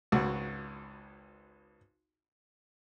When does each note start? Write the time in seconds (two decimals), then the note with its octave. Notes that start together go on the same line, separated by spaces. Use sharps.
0.12 G#1 C#2 F#4